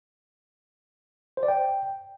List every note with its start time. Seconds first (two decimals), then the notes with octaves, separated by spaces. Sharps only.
1.37 C5
1.43 D5
1.48 G5